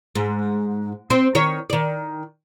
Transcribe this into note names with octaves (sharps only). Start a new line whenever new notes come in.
G#2
C4 C5
D#3 C#5
D#3 D5